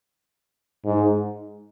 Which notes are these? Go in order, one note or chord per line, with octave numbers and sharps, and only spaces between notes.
G#2